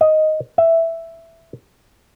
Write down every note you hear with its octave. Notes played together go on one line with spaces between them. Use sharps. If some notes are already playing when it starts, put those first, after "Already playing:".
D#5
E5